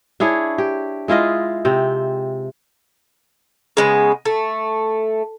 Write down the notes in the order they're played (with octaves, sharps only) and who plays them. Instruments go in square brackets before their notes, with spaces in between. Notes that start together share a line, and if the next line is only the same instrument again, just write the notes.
[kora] D4 E4 G#4 C#5
G4
G#3 E4 F4 D#5
C3 C4
[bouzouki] C#3 G#3 B3
A3